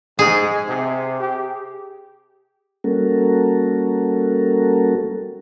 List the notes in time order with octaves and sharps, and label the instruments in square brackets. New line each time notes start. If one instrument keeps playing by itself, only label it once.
[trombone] G#2 [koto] G#4
[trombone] C3
G4
[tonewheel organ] G3 A#3 C#4 F#4 A4 A#4